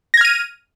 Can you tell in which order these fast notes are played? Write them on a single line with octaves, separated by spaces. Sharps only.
A#6 G#6 F6 D#7